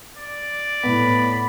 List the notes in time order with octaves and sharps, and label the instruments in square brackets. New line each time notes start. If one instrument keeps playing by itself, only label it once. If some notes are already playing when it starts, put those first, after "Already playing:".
[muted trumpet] D5
[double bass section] A2 [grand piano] B3 [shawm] B5